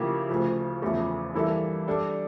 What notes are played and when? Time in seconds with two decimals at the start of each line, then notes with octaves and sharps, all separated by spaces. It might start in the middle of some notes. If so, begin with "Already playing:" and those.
Already playing: C#3 F3 A#3 E4 G4
0.29 D2 C#3 F3
0.82 E2 C#3 F3 A3 C#4
1.34 G2 E3 A#3 E4 A4
1.87 G3 D4 A4